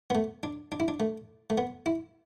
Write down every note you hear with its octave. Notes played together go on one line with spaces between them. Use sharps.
B3
A3
D4
D4
E4
D4
A3
A3
B3
E4